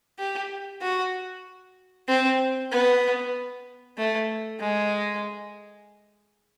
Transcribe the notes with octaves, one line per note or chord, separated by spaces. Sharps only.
G4
F#4
C4
B3
A3
G#3